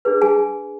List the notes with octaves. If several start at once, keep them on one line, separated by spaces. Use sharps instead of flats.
D4 G#4 B4
G#4 G#5